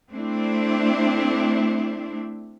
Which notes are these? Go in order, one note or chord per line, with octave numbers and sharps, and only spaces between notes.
A3 C4 D4 E4